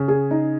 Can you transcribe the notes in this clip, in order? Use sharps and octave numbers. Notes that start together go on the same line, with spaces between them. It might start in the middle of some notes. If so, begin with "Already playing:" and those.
Already playing: C#3
G#4
D#4